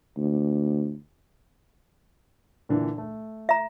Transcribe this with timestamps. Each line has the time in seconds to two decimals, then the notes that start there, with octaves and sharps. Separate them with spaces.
0.17 D2
2.69 A#2 D3 E3
2.98 A3
3.49 E5 A#5